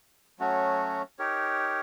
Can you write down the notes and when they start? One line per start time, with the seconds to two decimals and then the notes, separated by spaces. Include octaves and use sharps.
0.39 F#3 A3 C#4 F#4
1.19 D#4 G4 A#4 C#5